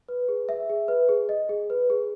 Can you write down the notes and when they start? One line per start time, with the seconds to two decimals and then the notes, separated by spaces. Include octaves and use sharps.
0.09 B4
0.28 G#4
0.49 E5
0.69 G#4
0.88 B4
1.09 G#4
1.29 D#5
1.49 G#4
1.70 B4
1.90 G#4